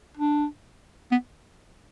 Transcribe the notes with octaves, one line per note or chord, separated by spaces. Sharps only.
D4
B3